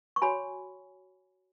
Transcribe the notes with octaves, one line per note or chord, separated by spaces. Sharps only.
C#6
F#4 C#5 G#5 B5